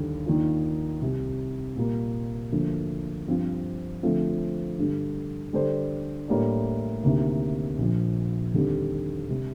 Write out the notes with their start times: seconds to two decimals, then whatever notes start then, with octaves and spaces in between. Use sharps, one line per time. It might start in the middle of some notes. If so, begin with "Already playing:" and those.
Already playing: D#2 D3 G3
0.26 D#2 D#3 A#3 D4 F4
1.01 C2 C3 G3
1.76 A#2 G3 A#3
2.52 D2 D3 F3 A#3
3.27 G2 F3 C4 F4
4.03 D3 F3 A3 C4 F4
4.78 G2 D3 G3
5.53 D3 G3 D4 A4 C5
6.28 A2 G3 A#3 D4
7.03 D2 C3 D#3 A#3
7.78 A#1 A#2 F3
8.54 D#2 D3 G3 C4 G4
9.30 C3 G3